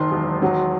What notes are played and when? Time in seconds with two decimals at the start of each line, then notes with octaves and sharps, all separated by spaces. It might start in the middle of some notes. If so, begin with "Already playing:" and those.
Already playing: F#1 D#3 C6
0.11 E1
0.42 F#3